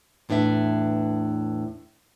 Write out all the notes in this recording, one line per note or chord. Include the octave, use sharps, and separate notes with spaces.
E2 A2 D4 B4 E5